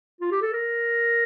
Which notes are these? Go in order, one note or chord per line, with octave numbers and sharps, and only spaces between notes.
F4
G4
A4
A#4